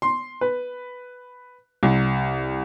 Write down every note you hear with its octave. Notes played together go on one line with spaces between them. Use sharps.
C6
B4
C2